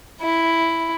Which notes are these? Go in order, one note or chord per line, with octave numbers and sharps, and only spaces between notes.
E4